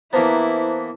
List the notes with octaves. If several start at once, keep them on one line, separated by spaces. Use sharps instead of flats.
E3 A#3 B3 E4 C5 A5 A#5